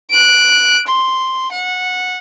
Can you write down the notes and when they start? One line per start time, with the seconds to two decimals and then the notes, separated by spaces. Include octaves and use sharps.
0.10 F#6 D7
0.87 C6
1.51 F#5